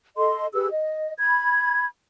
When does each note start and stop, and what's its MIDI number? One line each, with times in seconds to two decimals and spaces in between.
0.17 0.46 69
0.17 0.46 75
0.17 0.46 84
0.53 0.68 67
0.53 0.68 68
0.53 0.68 71
0.53 0.68 88
0.70 1.12 75
1.19 1.86 83
1.19 1.86 92